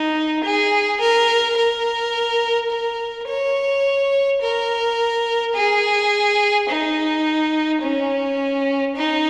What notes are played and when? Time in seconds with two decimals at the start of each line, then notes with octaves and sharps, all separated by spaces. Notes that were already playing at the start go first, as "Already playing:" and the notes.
Already playing: D#4
0.44 G#4
1.00 A#4
1.56 A#4
2.70 A#4
3.28 C#5
4.41 A#4
5.55 G#4
6.69 D#4
7.82 C#4
8.96 D#4